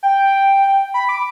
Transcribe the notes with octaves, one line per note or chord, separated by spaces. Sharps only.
G5
B5
D6